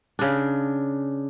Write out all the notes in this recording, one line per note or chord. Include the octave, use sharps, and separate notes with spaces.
C#3 D4